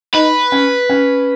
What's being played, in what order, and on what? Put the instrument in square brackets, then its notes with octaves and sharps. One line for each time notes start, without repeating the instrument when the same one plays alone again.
[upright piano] D#4 [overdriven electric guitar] B4
[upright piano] C#4
C#4